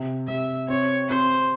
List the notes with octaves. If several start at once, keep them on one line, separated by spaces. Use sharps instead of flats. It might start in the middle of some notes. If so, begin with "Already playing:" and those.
Already playing: C3
C3 E5
C4 C#5
C4 C5